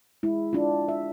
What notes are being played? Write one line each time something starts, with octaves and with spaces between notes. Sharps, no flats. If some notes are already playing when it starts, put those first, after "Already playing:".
G#3 E4
D4 F4
E5